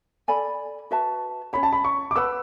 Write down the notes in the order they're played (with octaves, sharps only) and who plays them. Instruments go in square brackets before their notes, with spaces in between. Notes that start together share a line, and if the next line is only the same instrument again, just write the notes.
[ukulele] A4 D5 G#5 B5
F#4 B4 E5 A5
[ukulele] C#4 F#4 C#5 [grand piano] B5
[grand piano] A5
B5
C#6
D6
[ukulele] B4 F#5 B5 [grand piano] E6